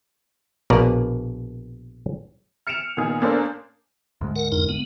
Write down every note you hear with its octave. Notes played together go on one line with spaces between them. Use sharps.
A#1 B2 A#3 B4 D5 A#5
F6 C#7 D7 E7 F7
A#2 D#3 B3 D#4 G#4
A#3 C#4 D4 G#4 A4 C5
D2 G#2 G#3
A#4 F#5
F2 D#4 A#4
B3